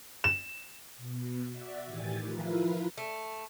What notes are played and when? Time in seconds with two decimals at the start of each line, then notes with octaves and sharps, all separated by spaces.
0.24 E7
0.97 B2
1.50 F#4 D5 E5
1.86 A2 D#3 E3 G4 G#5 A6
2.21 F3 E4 F4 A#4 B4
2.98 A3